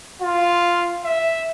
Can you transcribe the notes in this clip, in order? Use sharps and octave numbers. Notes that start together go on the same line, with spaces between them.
F4
E5